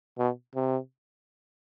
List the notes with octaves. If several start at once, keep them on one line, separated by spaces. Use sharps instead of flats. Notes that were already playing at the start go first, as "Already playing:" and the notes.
B2
C3